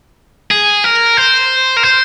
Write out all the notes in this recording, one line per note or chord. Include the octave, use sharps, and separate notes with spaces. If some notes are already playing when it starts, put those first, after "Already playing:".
G#4
A#4
C5
A#4
C5